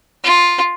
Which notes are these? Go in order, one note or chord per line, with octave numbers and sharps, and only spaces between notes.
F4